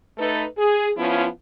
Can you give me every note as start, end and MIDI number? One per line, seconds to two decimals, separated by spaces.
0.18 0.45 57
0.18 0.45 63
0.18 0.45 69
0.18 0.45 71
0.57 0.90 68
0.97 1.27 53
0.97 1.27 59
0.97 1.27 61
0.97 1.27 64
0.97 1.27 65